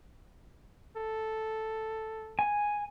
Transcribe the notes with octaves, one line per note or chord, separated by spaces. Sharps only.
A4
G#5